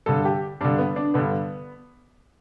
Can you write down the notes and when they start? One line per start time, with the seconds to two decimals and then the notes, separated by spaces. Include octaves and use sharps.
0.06 G2 D3 A4
0.25 G4
0.61 G2 D3 D4
0.78 B3
0.96 D4
1.14 G2 D3 B3